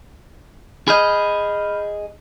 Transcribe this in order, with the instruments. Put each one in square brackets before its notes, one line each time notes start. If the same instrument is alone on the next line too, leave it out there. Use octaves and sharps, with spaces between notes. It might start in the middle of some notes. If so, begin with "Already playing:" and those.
[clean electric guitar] G#4 D#5 [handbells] B5 F6 G6